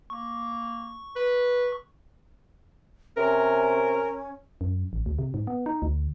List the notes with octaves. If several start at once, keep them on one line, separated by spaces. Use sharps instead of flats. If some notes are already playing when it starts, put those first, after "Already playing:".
A#3 C#6
B4
C3 C#4 A#4
F#2
A1
D2
C3
G#2
B3
D#4
D2